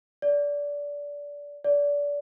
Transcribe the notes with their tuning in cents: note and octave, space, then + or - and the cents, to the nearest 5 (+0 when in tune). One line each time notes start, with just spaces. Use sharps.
D5 -20
D5 -25